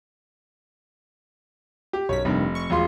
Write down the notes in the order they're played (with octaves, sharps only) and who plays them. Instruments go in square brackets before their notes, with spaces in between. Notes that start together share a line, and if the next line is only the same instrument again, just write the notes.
[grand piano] G4
[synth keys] B1 F#2 B6 [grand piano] C#5
[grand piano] F1 [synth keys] G2 C3 D#3
[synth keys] C#6
[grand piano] E1 F4 C6